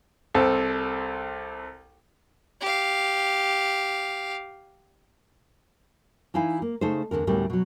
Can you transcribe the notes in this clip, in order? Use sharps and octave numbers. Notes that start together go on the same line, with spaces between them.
C2 C4 A4
G4 F5
E3 D#4 E4 F5 G#5
A#3
C#3 A3 D#4 A4 C5
E2 A#2 D3 A#4
D2 A2 G3 B3 C#4 A#4
B2 F#3